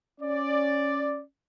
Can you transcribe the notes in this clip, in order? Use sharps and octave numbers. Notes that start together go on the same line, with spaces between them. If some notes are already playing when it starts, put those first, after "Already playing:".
C#4 D5